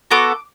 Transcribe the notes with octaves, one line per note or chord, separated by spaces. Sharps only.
B3 F#4 A4 D6